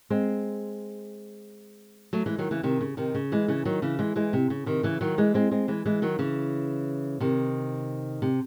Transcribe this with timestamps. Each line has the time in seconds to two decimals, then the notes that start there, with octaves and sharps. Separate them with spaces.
0.10 G#3 C4
2.13 F#3 A3
2.26 E3 G#3
2.38 D#3 F#3
2.51 C#3 E3
2.63 C3 D#3
2.81 C#3
2.97 C3 D#3
3.15 C#3
3.32 E3 G#3
3.48 C#3 E3
3.65 D#3 F#3
3.82 C#3 E3
3.99 E3 G#3
4.16 E3 G#3
4.33 C3
4.50 C#3
4.66 C3 D#3
4.83 C#3 E3
5.01 D#3 F#3
5.18 E3 G#3
5.34 G#3 C4
5.52 G#3 C4
5.68 E3 G#3
5.86 E3 G#3
6.02 D#3 F#3
6.19 C#3 E3
7.20 C3 D#3
8.22 C3